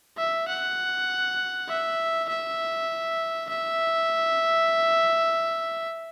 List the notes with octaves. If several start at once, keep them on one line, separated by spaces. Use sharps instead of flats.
E5
F#5
E5
E5
E5